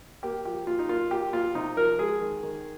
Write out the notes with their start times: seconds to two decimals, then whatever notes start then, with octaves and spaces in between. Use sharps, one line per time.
0.23 A#3 G4
0.45 F3 G4
0.67 A#2 F4
0.79 D#4
0.89 A#3 F4
1.11 A#2 G4
1.33 A#2 F4
1.55 C3 D#4
1.77 F3 A#4
1.99 G#3 G#4
2.21 D#3
2.43 D#3